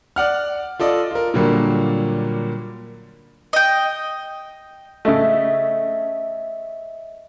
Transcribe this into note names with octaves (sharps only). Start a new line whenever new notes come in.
D5 F#5 F6
F4 A4 D5 D#5
F4 A#4
A#2 D3 F#3 G3 A#3
D#5 G5
C#3 A3 D#5 E5